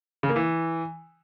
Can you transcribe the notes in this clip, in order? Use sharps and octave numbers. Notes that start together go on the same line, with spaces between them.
C#3
A#3
E3